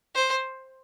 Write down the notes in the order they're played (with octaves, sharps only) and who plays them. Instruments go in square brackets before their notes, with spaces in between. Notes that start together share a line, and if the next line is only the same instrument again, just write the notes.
[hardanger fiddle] C5